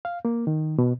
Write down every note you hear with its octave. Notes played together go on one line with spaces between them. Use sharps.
F5
A#3
D#3
B2